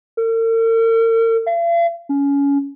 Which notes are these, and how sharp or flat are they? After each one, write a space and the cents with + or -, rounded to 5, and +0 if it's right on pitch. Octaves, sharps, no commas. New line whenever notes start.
A#4 -45
F5 -45
C#4 +20